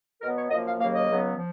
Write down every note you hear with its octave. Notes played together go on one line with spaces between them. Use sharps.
B2 F#3 B3 A#4
C#5
F#2 F3 A#3 D#5
F5
D#2 C#3 F#3 A#3 F5
D#5
C#2 C#3 F#3 B3
F3